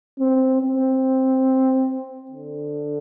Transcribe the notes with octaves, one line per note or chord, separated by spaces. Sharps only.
C4
C4
D3